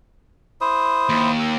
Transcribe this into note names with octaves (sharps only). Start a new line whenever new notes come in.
E4 C5 D#6
D#2
E6